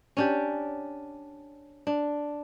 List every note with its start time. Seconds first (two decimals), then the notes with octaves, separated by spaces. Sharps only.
0.17 C#4 D4 G4
1.87 D4